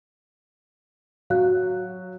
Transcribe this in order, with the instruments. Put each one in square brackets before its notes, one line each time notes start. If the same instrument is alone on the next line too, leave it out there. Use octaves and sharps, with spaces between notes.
[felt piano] F#3 [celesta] F5 F#6